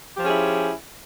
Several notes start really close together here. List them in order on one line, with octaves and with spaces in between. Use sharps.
G4 F3 C#4 G#4 E4